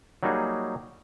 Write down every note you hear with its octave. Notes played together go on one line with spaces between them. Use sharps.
F#3 G3 A#3 D#4 F#4 G#4